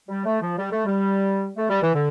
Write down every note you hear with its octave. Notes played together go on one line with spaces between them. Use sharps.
G3
A3
F3
G3
A3
G3
A3
G3
E3
D3